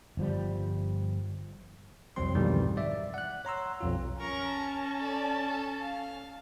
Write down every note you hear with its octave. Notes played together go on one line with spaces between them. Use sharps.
G1 F3 G3
C2 F2 F#3 C4 C6
F2 G#2 B2 D#3 E3 G3
D5 E5
F#5 F#6
C#5 A#5 C6 E6
B1 F2 F4
C#4 A#4 A#5 C#6
A5
A4 D5
A4
F5